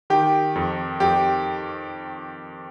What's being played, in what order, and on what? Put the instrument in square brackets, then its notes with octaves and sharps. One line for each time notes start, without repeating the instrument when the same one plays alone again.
[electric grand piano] D#3 G4
F2
F2 G4